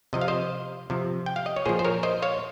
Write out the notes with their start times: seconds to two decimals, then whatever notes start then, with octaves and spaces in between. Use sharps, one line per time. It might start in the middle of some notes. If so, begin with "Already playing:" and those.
0.13 C3 F3 D#5
0.21 F5
0.28 C5 D#5
0.90 C3 F3
1.26 G5
1.36 F5
1.46 D#5
1.56 C#5
1.66 A#2 F3 G#4 C5
1.79 C5
1.85 A#4 C#5
2.03 C5 D#5
2.22 C#5 F5